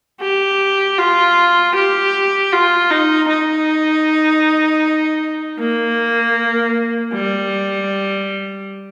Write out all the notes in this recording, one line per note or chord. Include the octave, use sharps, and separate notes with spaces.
G4
F4
G4
F4
D#4
D#4
A#3
G3